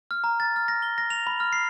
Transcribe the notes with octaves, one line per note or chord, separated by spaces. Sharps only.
F6
A#5
A6
F6
A#6
G7
A#6
F7
B5
F6
C7